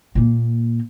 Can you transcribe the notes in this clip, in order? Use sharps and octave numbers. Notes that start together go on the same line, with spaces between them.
A#2 A#3